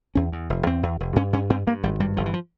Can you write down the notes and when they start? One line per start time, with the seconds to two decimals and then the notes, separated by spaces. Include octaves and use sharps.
0.15 E2 C#4
0.32 E2
0.50 F1
0.66 E2 C4
0.83 E2
1.00 F1
1.16 G2 C#4
1.33 G2 C#4
1.50 G2 C4
1.67 G2 A#3
1.83 G#1 G3
2.00 G2 G3
2.17 G1 F3
2.26 E3
2.34 F3